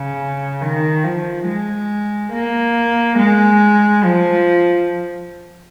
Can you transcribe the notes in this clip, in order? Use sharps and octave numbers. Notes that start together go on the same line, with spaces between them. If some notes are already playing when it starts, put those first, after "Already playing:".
Already playing: C#3
D#3
F3
G#3
A#3
G#3
F3